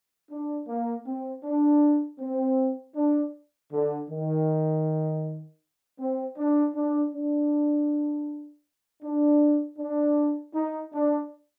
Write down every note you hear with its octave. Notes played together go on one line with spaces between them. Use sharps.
D4
A#3
C4
D4
C4
D4
D3
D#3
C4
D4
D4
D4
D4
D4
D#4
D4